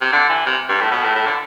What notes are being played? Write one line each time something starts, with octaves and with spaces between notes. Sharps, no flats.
C3
D3
E3
C3
G2
A2
B2
A2
A2
D3